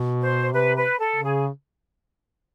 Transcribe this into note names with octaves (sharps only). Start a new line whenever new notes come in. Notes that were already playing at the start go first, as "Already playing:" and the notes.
Already playing: B2
C5
C3 B4
B4
A4
C#3
G#4